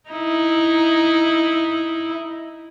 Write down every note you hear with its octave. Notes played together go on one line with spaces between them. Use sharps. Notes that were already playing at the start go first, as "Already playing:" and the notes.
D#4 E4